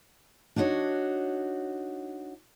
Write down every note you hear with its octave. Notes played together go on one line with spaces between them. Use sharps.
D4 D#4 F#4 C5 C#5